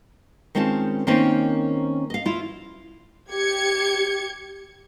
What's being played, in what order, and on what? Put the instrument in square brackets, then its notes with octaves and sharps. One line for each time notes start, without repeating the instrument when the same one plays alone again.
[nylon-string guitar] D#3 G#3 C4 C#4 F4 A5
D#3 A#3 C4 C#4 C5
D#5 F5
E4 F4
[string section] G4 G#6 C#7